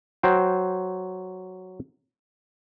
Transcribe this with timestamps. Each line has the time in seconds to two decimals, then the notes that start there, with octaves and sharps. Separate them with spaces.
0.23 F#3 C5 G5